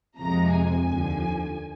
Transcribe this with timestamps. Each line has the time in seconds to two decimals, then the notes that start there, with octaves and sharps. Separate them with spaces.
0.19 F2 C3 F3 G#3 A#5
0.52 G#5
0.85 D#2 D3 F3